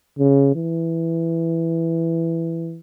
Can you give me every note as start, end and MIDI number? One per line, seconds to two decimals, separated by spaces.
0.19 0.51 49
0.55 2.80 52